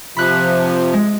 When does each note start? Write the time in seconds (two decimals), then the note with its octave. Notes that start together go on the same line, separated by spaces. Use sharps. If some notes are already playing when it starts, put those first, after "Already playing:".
0.17 C3 F3 B5 F#6
0.93 G#3